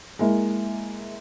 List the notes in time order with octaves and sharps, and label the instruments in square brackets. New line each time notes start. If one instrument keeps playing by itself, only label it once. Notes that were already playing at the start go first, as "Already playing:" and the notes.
[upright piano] G#3 A#3 E4